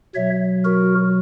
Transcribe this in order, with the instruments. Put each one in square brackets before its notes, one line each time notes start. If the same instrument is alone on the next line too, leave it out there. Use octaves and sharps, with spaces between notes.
[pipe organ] B2 F#3 C#5 E5
F#4 A#4